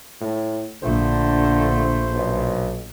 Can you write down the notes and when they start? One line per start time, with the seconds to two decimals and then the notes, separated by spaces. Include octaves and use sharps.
0.21 A2
0.82 A#1 D3 A3 C5
2.13 B1